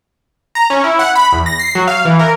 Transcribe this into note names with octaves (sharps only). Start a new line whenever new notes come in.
A#5
C#4
E4
F#5
B5
E2
A#6
C7
F#3
F5
E3
A#4